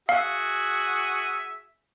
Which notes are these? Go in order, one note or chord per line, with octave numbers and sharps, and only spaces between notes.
F#4 G#4 E5 F5